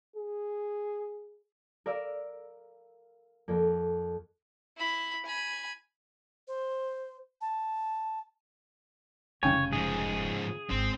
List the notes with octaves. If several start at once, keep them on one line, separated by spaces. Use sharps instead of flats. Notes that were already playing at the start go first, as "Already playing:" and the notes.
G#4
A#4 D5 F5 E6
F2 A#3
E4 B5
G#5 B5
C5
A5
F1 C#3 G3 C#5 G5 G#5
G#2 F3 G#4
G#1 C4